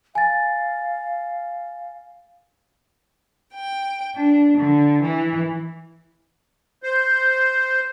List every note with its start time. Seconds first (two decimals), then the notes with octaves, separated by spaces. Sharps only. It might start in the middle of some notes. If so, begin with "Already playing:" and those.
0.15 F5 G#5 A6
3.54 G5
4.16 D4
4.57 D3
5.02 E3
6.83 C5